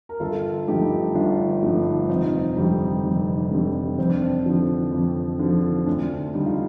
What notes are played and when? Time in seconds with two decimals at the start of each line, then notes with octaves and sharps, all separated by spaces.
0.09 A#4
0.20 G1 F4 A4
0.68 G2 D3 F3 A3 D#4 G4
1.15 G1 D4 F4
1.62 G2 D3 F3 A3
2.09 F1 C4 D#4
2.56 F2 D3 G3
3.04 F1
3.51 F2 D3 G3
3.98 F2 C4
4.10 D4
4.22 C4
4.46 D3 F3
4.93 F2
5.39 D3 F3
5.86 D2 D4
6.34 D3 G3 D#4
6.46 F4